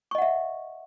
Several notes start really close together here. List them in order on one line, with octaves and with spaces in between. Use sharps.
C#6 D#5 F#5 E5